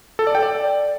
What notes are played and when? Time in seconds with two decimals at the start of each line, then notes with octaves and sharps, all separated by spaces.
0.19 A4
0.27 D5
0.35 G5
0.43 D5